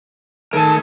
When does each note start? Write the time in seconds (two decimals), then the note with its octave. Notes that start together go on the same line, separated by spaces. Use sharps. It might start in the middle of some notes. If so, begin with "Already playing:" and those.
0.53 D#3 A3 G#4 A#4 A5